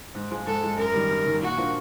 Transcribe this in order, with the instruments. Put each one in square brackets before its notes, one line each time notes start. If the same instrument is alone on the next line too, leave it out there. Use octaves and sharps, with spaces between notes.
[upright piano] G#2
F3 G#3
[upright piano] G#2 [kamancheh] A4
[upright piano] F3 G#3
[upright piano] F#2 [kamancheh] A#4
[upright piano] D#3 G3
F#2
D#3 G3
[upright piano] A#2 [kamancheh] F#4
[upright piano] F3 A#3 D4 F4